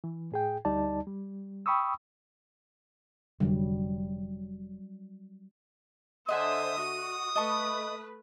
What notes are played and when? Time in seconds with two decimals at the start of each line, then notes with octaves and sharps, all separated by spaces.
0.04 E3
0.32 A2 G#4 G5
0.65 D2 G3 D#4 D5 A5
1.07 G3
1.66 G5 B5 C#6 D#6 E6
3.40 F1 D3 F#3 G3
6.29 D3 C5 D#5 E5 F#5 G#5 D#6
6.77 F#4 D#5
7.36 A3 B4 D#5 A5 C#6